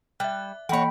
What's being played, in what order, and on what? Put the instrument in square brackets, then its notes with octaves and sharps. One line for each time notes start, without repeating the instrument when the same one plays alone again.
[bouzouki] G3 [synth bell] E5 F#6
[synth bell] E3 A#3 [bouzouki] F#4 C#5 [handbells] G5 B5